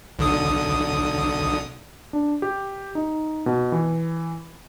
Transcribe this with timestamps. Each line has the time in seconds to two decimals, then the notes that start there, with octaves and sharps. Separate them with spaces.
0.19 B1 D3 D#6
2.13 D4
2.42 G4
2.95 D#4
3.46 B2
3.72 E3